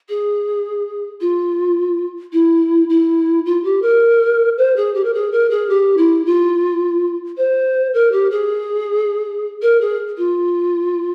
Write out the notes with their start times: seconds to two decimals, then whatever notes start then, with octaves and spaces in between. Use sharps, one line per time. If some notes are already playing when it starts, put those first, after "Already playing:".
0.09 G#4
1.21 F4
2.33 E4
2.89 E4
3.45 F4
3.64 G4
3.82 A#4
4.57 C5
4.76 G#4
4.94 G4
5.04 A#4
5.14 G#4
5.32 A#4
5.50 G#4
5.69 G4
5.97 E4
6.25 F4
7.37 C5
7.94 A#4
8.12 G4
8.30 G#4
9.62 A#4
9.81 G#4
10.17 F4